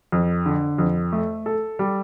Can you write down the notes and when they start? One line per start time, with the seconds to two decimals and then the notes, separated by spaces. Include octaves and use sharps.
0.12 F2
0.46 D3
0.78 F2
1.13 A3
1.46 A4
1.79 G3